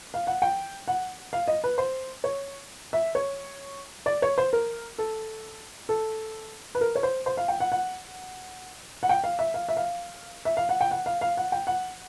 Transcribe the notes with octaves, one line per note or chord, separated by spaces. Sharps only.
F5
F#5
G5
F#5
F5
D#5
B4
C5
C#5
E5
C#5
D5
C#5
C5
A#4
A4
A4
B4
A#4
C#5
C5
C5
F5
G5
F#5
F#5
F#5
G5
F5
E5
F5
E5
F5
E5
F5
F#5
G5
F#5
F5
F5
F#5
G5
F#5